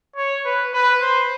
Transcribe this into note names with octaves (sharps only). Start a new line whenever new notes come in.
C#5
B4
B4
C5